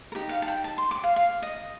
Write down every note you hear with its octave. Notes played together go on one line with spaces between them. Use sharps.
A#4
D#4 G4
F5
A5
G5
A5
C6
D6
F5
F5
D#5